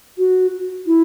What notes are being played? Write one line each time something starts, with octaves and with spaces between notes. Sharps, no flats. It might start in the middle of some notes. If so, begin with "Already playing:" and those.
F#4
E4